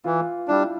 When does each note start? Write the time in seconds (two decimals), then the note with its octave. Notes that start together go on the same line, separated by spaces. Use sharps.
0.04 E3 F4
0.48 G3 D4 E4